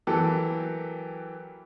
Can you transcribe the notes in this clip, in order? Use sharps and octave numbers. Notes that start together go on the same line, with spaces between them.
E3 F#3 A#3 G4 A4